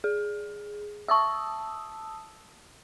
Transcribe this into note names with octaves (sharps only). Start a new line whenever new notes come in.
G#4
E5 A5 C#6 D#6 E6